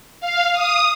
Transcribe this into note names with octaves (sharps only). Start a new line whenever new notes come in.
F5
D#6